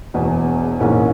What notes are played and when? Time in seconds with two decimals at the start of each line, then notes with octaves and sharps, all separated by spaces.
0.14 E1 E2 B2
0.80 A#1 G#2 E3 A#3 C#4